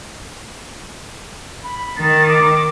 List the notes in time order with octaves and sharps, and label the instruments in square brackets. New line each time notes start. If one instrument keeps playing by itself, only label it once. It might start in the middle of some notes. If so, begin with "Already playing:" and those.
[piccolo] B5
[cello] D#3 [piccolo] A6
[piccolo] D6